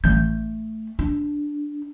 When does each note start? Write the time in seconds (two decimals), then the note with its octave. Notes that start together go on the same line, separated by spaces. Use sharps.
0.04 A1 A3 G6
0.99 D4